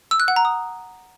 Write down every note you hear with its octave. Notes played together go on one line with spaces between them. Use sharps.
E6
F#6
F#5
A#5
D#6